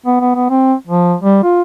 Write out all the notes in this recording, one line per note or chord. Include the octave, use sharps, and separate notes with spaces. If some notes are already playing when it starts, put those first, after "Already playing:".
B3
B3
B3
C4
F3
G3
F4